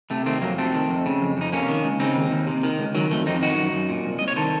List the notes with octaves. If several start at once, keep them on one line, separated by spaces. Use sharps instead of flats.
C3 A3
D#3 A3 C4
F2 F#3 A#3
C3 A3 C4
D#3
F2
C#3
F2
F2 D#4
C3 A#3 C#4
D#3
C#2
C#3 C4 D#4
D#2
D#2
C3
D#3
C#2
D#3 F#3
F2 A3
F2 C4 D#4
D#3 D#4 F#4
F#2
F#2
A#2
C2
C2 D#5
C#5
D#3 A4 C5